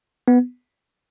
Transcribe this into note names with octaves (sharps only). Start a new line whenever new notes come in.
B3